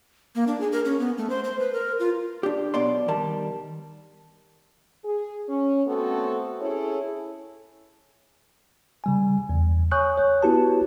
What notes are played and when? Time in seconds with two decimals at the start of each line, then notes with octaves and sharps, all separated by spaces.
0.35 A#3
0.47 D4
0.61 G#4
0.72 A#4
0.85 C#4
1.00 B3
1.18 A3
1.30 C5
1.44 C5
1.59 B4
1.73 A#4
1.99 F4
2.43 D4 G4
2.74 B1 B2 D5 C6
3.08 D#3 G3 A#4 A5
5.04 G#4
5.48 C#4
5.87 A3 B3 C4 F#4 A4
6.61 C#4 E4 G#4 A4 C#5
9.04 C#3 G3 G#5
9.49 E2
9.91 C#5 G#5 C#6 D#6 F#6 G6
10.18 C#5
10.43 B3 E4 F#4 G4 B4 A5